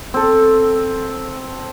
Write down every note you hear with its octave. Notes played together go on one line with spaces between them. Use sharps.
C4 A4